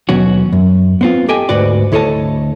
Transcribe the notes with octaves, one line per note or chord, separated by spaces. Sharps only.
D#2 B2 F#3 C#4 F#4
F#2
B3 C4 F4
G4 A4 D#5 G5 G#5
D2 G#2 F#4 B4 D5
D2 E4 A4 C#5 D#5 A5